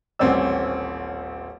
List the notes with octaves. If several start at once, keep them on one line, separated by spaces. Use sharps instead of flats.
D#1 A1 C4 C#4 D5 E6